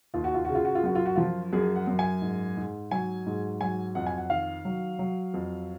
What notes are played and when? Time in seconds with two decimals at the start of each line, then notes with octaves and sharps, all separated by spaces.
0.14 D#2 F4
0.24 F#4
0.34 F4
0.45 C#3 F#4
0.55 F4
0.65 F#4
0.75 F4
0.84 F#2 F#4
0.95 F4
1.06 F#4
1.16 F3 F4
1.53 F#2 G#4
1.75 F#5
1.87 F#2
1.99 G#5
2.22 G#2
2.57 G#2
2.91 F#3 G#5
3.26 G#2
3.61 F#3 G#5
3.95 F2 F#5
4.06 G#5
4.17 F#5
4.30 D#3 F5
4.65 F#3
4.99 F#3
5.34 F2